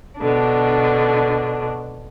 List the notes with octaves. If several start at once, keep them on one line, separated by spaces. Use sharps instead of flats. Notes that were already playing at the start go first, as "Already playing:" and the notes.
B2 D3 D4